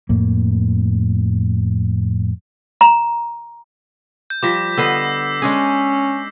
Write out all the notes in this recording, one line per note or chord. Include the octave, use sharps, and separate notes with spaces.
F2 A2 A#3
A#5
G6
F3 G3 D6 A#6 B6
D3 B3 D#5 E6 C7
G#3 C#4 D4 G#4